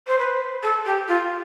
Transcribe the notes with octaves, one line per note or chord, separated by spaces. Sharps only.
C5
B4
A4
G4
F4